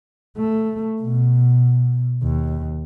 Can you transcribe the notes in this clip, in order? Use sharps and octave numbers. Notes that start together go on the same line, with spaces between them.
A3
B2
D#2